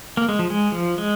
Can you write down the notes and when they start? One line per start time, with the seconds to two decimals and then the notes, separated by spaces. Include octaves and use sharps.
0.17 A#3
0.29 G#3
0.39 F3
0.50 G#3
0.72 F3
0.98 G#3